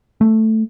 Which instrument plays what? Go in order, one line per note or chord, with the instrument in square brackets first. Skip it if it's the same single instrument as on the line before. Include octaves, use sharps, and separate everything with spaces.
[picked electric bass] A3